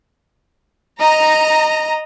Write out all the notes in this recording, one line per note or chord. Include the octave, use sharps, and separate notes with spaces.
D#5 A#5